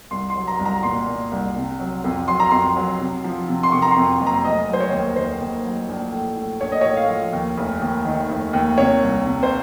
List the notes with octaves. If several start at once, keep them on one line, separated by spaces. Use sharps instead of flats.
C2 C6
C6
F#3
A#5
C2
A#5
A#2 C6
A#2
C2
C3
F#3
F2
F#3 C6
A#5
F2 C6
F#3
C3
F3
C3
C6
C3 C#6
A#5
C6
F2
F#1
A#5
F1 D#5
F#3 C5
C#5
D#2
D#2 C5
D#2
F#3
A#1
A2
A2
A#1 C#5
D#5
A2 C#5
F5
F3
D#2
F1
D#2
D#3
F1
D#2
C3 C#5
C2
C3
C5